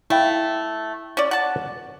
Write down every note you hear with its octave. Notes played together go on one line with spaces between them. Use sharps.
A3 E4 F5 G5
C#4 D5
F#5 A5